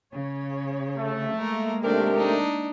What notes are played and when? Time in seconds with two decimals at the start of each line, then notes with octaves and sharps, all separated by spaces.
0.12 C#3 C#5
0.97 A3
1.38 G#3 A#3 A#4
1.84 C3 D#3 A3 D4 G4 A#4
2.16 D4 D#4